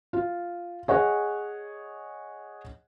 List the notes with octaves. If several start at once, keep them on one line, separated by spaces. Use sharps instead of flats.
F4
G#4 C#5 D#5 F#5 G#5